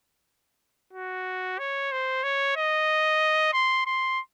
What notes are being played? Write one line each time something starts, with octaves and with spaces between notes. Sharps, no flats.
F#4
C#5
C5
C#5
D#5
C6
C6